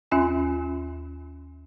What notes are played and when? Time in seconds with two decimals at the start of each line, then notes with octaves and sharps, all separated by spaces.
0.11 D#2 C#4 F4 G#5 C6